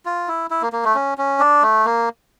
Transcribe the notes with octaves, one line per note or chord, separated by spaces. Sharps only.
F4
E4
E4
A#3
A#3
A3
C#4
C#4
D4
A3
A#3